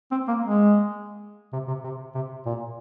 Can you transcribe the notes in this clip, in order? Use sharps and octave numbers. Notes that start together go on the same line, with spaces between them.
C4
A#3
G#3
C3
C3
C3
C3
A#2